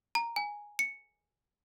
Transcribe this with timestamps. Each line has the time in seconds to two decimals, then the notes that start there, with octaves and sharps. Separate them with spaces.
0.15 A#5
0.36 G#5
0.79 C#7